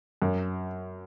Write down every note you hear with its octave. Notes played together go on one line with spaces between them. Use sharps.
F#2